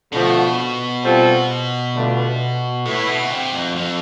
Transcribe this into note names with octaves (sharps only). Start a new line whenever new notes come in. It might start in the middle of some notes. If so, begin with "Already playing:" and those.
B2 D3 F3 A3
G3 C4 F4 A4 C5
G2 D3 A3 D4 F4
A2 E3 A3 E4 B4
B2
C3
F2
F2